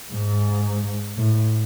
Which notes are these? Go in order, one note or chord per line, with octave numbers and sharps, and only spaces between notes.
G#2
A2